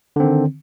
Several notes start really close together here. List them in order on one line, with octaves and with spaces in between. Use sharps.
D3 C4 D#3